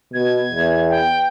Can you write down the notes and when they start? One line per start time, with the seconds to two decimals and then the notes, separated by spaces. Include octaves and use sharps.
0.14 B2 G#6
0.52 E2
0.90 G5